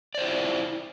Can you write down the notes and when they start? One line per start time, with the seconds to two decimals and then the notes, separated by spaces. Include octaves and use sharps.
0.15 D5
0.18 C5
0.21 F4
0.24 E4